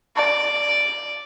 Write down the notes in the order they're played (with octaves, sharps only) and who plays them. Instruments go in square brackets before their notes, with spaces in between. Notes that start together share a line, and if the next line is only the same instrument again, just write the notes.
[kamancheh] D5